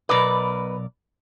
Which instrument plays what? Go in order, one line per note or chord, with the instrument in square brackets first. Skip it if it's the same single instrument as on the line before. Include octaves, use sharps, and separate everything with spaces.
[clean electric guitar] B1 A#4 D5 [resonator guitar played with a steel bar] B2 B4